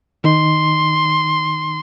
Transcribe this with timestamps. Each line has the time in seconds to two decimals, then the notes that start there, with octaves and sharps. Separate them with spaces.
0.24 D#3 D#4 C6